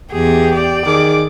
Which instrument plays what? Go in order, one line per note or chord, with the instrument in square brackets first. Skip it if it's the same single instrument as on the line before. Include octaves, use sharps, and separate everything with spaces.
[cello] E2 G#4 [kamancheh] G4
[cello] D5
[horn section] D#3 G#4 [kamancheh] D6